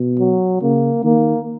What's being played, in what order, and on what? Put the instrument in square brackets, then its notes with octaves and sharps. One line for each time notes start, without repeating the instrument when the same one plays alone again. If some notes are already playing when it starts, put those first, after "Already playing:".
Already playing: [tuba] B2
[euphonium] F#3
[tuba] C#3 [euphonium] A#3
[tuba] D#3 [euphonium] A#3